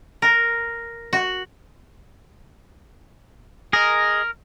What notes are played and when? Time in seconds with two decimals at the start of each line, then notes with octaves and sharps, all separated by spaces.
0.22 A#4
1.13 F#4
3.73 G#4 A#4 D#5